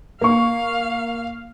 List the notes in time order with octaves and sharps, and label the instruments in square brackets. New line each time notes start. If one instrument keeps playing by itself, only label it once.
[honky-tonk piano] A#3 C#6 [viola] F5